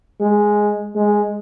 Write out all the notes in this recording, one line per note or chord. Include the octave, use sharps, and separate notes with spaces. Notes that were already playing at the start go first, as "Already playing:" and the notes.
G#3
G#3